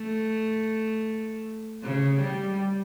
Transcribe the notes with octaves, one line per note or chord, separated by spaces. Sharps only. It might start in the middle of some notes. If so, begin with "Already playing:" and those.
Already playing: A3
C#3
G3